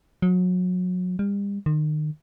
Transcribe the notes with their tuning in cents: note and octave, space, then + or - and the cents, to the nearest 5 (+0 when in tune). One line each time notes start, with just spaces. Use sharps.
F#3 -30
G3 +40
D#3 -35